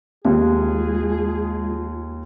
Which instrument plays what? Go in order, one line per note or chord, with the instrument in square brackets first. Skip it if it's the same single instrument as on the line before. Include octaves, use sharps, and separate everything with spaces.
[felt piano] D#2 [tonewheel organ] G#3 F4 [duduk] G#4